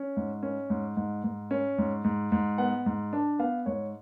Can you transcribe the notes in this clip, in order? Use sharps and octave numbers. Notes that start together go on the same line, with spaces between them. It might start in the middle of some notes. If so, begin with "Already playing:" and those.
Already playing: C#4
G#2
C#4
G#2
G#2
G#2
C#4
G#2
G#2
G#2
B3 F#5
G#2
D4
B3 F5
G#2 C#5